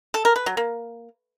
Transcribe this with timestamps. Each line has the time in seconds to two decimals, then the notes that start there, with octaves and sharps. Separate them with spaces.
0.14 A4
0.25 A#4
0.36 B4
0.46 F#3
0.57 A#3